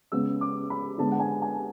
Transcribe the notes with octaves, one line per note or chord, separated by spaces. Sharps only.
C#3 G#3 B3 E6
D6
B5
D3 G#3 B3 A5
F#5
G#5
G#5